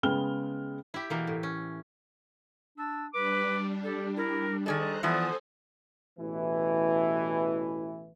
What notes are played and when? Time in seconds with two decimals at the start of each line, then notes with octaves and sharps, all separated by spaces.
0.03 C#3 G#3 B3 G5 F6 G7
0.94 E4 G4
1.10 B2 E3 A#3
1.27 A2
1.43 C#4
2.78 D4 E6
3.13 G3 D4 B4 D6
3.83 G4 A4
4.17 E4 A#4
4.66 D#3 G#4 A4 C5 D5 D#5 A#5 F#6
5.03 E3 F3 B3 A4 C5 D5 G#5 D#6
6.19 A1 B2 E3